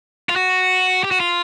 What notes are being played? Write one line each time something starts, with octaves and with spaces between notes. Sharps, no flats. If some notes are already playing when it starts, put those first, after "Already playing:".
F4
F#4
G4
F#4
F4